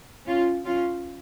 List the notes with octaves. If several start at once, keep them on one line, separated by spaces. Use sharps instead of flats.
C#4 F4
C#4 F4